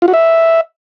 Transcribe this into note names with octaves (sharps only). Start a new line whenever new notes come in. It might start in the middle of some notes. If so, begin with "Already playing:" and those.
F4
F#4
E5